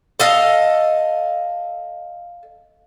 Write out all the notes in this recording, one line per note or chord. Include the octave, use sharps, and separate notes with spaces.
A4 D#5 F5